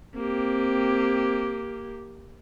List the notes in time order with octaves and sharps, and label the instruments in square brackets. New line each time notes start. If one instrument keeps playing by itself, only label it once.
[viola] A#3 G4 [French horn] C4